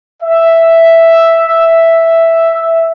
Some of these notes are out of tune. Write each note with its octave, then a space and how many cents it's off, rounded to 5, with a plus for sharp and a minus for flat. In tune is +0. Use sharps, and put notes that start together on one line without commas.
E5 +0